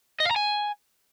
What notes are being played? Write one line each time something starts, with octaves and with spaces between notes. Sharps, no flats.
D#5
F5
A#5
G#5